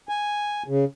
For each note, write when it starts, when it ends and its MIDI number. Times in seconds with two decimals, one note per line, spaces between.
0.09 0.63 80
0.68 0.85 49